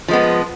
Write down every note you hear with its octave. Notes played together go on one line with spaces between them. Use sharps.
F3 G#3 B3